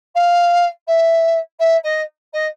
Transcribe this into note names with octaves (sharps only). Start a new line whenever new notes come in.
F5
E5
E5
D#5
D#5